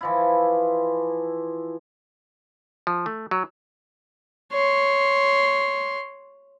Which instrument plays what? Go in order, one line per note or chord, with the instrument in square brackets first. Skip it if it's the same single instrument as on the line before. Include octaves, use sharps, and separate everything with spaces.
[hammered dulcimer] E3 F3 E4
[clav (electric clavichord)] F3
A3
F#3
[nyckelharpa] C#5 C6